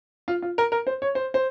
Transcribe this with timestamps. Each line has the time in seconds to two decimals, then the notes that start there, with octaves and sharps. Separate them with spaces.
0.28 F4
0.42 F4
0.58 A#4
0.72 A#4
0.87 C5
1.02 C#5
1.15 C5
1.34 C5